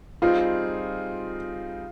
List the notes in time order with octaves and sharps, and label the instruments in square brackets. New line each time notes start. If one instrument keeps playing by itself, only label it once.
[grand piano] G3 C4 D#4 G#4 [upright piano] F4